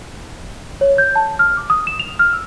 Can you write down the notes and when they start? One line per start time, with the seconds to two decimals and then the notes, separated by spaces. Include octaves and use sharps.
0.81 C#5
0.98 G6
1.16 A5
1.39 F6
1.57 D6
1.70 D#6
1.87 E7
2.00 F7
2.19 F6
2.33 E6